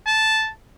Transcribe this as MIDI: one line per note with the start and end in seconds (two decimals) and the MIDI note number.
0.07 0.49 81